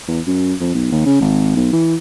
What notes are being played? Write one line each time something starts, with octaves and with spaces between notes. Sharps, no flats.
E2
F#2
F2
B1
D#2
C#3
G#1
B1
E3